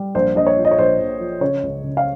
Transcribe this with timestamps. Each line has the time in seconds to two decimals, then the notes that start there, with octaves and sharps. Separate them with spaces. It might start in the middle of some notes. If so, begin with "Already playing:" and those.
Already playing: G3
0.15 A#1 C5
0.36 A#1 D#5
0.47 C#5
0.57 F3
0.65 D#5
0.71 C#5
0.79 A#1 C5
1.00 A#1
1.20 F3
1.41 C#3 C#5
1.63 C#2
1.84 C#3
1.97 F5